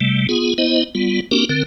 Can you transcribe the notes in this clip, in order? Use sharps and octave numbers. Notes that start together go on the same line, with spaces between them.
C3 G3 A3
B3 F4 G#4
B3 E4 C5 D#5
G3 B3 F4
A#3 C4 D4 F#4 G4 A#4
D3 C4 A#4